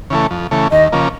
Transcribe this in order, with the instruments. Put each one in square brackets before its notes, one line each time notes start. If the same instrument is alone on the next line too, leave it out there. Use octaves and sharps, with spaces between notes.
[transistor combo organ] C#3 E3 A3
F2
C#3 E3 A3
[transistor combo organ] D#2 [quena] D#5
[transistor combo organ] C#3 F3 A#3